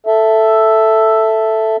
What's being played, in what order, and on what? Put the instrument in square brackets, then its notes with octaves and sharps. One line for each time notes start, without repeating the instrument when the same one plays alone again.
[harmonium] A4 E5